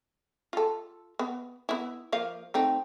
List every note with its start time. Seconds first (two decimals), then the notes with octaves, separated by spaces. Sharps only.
0.53 F4 A4
1.19 B3
1.69 B3 E4
2.12 F3 A#3 F5
2.54 A3 C4 D#4